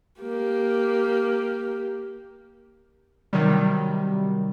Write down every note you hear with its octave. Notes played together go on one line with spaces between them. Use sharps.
A#3 G4
C3 D#3 F#3 G3